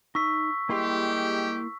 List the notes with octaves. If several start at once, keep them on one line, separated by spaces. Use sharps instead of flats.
D#4 C#6 E6 B6
G3 G#3 A#3 E4 G4 C6